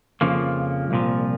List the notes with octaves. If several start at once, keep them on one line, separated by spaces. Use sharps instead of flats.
F2 C#3 F3 A#3
C2 A#2 F3